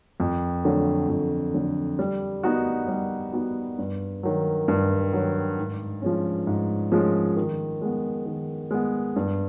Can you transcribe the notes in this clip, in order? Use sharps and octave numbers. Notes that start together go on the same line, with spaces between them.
F2
D3 F#3 A3
F2
D3 F#3 A3
G3
B3 D#4 F#4
G3
B3 D#4 F#4
G2
D#3 F#3
G2
D#3 F#3
G#2
F3 G#3 C#4
G#2
F3 G#3 C#4
D#3
G#3 B3
D#3
G#3 B3
G2